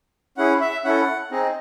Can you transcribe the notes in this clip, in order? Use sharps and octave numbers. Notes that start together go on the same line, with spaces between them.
C#4 E4 G#4 F#5
E5
C#4 E4 A4 F#5
C4 D#4 G#4 D#5